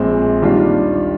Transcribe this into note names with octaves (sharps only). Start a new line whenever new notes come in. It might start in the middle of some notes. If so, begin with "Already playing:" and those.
Already playing: A#1 A#2 G#3 C4
D#2 D#3 G3 D4 F4